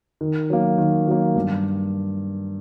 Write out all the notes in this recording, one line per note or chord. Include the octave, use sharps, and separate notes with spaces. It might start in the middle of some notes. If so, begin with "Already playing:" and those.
D#3
F#3 A#3
D#3
F#3 A#3
G2